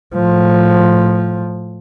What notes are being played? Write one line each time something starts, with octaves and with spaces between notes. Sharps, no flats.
A2 F3